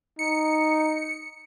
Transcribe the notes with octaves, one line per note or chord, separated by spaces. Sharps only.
D#4 C#7